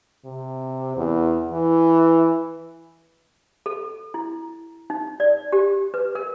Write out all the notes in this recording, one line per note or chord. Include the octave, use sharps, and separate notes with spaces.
C3
E2
E3
A4
E4
D#4
D5
G4
B4
A#4